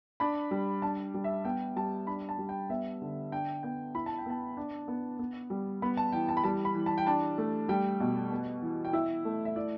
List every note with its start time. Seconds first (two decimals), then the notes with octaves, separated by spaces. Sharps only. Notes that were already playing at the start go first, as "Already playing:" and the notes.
0.20 D4 B5
0.51 G3
0.82 D4 A5
1.14 G3
1.24 E5
1.45 B3 G5
1.76 G3 A5
2.07 D4 B5
2.29 A5
2.38 G3
2.49 G5
2.70 B3 E5
3.02 D3
3.32 D4 G5
3.63 B3 G5
3.95 E4 B5
4.06 A5
4.18 G5
4.26 B3 A5
4.57 D4
4.88 B3
5.19 B3
5.50 G3
5.82 B3 B5
5.97 A5
6.13 E3 G5
6.29 A5
6.37 B5
6.44 G3 A5
6.65 B5
6.75 E3
6.86 A5
6.98 G5
7.07 D4 A5
7.38 A3
7.69 G3 G5
8.00 B2
8.31 B3
8.62 E3
8.85 G5
8.93 E4 E5
9.25 A3
9.45 E5
9.56 E4 D5